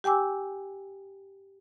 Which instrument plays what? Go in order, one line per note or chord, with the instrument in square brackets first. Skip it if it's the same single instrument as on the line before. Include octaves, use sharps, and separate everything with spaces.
[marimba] G4 G5 G#5 D6 E6